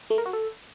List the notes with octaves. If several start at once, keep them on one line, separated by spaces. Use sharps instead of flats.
A3
A#4
F#4
A4